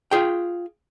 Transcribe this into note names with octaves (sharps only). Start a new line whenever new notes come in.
F4 G#4 G5